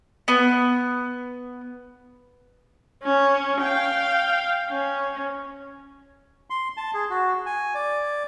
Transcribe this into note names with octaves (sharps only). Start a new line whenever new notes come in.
B3
C#4
F5 G5
C#4
C6
A5
G#4
F#4
G#5
D5